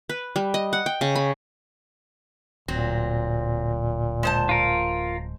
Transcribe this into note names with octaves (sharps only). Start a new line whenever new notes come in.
B4
G3
D#5
F#5
G5
C#3
B5
D1 A#2 F#3 C4
G#3 C5 A5
F4 A#4